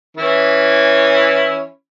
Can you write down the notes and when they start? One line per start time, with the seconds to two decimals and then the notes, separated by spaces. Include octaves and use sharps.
0.17 E3 C#4 E4